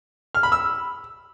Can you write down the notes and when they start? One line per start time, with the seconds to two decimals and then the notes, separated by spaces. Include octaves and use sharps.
0.35 F6
0.43 B5
0.52 E6